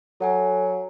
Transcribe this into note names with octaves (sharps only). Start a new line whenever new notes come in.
F#3 A4 F#5 G#5